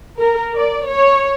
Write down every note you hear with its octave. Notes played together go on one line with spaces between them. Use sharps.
A#4
D5
C#5